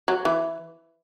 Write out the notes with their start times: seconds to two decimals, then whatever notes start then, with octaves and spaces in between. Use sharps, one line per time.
0.08 F#3
0.25 E3